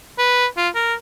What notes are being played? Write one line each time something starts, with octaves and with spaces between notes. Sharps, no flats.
B4
F4
A#4